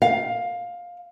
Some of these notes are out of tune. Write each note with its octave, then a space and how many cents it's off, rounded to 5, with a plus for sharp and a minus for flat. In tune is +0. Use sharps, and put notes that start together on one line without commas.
F5 +15